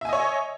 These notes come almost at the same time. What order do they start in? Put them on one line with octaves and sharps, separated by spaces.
E5 G#5 D#5 C#5